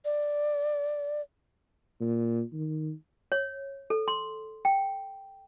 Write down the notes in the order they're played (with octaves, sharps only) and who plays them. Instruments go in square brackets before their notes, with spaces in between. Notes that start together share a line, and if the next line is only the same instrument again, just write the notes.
[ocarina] D5
[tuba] A#2
D#3
[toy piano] C#5
A4
C6
G5